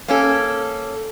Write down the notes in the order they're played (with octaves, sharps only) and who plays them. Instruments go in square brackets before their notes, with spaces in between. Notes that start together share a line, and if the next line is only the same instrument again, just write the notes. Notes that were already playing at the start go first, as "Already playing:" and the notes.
[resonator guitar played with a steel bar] A#3 C#4 A4